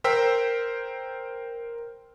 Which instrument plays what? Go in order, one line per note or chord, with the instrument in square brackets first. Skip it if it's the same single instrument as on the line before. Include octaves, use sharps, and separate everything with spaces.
[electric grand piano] A#4 C5 G5 E6 B6